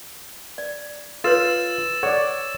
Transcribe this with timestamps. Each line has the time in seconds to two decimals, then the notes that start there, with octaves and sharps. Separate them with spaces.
0.58 D5
1.24 F4 A4 B4 C#5 E6 A6 E7
2.03 A4 C#5 D5 F#5